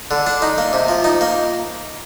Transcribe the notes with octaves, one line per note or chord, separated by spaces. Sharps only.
D3
D4
D#4
A#3
C3
F3
D#4
A#3